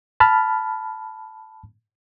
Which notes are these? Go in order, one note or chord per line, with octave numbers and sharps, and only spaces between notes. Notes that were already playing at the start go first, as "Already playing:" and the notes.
A5 B5 F6